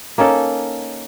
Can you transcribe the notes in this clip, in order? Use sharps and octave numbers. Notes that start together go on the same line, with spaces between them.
A#3 C#4 D#4 A4